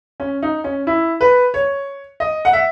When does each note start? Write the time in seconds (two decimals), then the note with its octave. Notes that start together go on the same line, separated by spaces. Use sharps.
0.20 C#4
0.43 D#4
0.64 C#4
0.87 E4
1.21 B4
1.54 C#5
2.20 D#5
2.45 F#5
2.53 E5